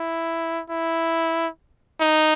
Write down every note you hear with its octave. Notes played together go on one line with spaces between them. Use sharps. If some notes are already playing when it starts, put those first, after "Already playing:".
Already playing: E4
E4
D#4